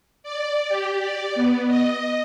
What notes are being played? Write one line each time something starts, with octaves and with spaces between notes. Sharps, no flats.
D5
G4
D5
B3
D#5